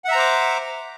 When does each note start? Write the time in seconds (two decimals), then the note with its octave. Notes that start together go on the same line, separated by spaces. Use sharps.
0.05 F#5
0.08 E5
0.12 A#5
0.15 C5
0.19 D6